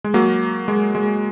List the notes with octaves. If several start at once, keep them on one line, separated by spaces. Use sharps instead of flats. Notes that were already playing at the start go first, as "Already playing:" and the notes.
G#3
F#3 A#3
G#3
G#3